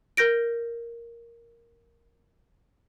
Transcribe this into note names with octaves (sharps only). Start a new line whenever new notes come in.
A#4 G6 A#6 D7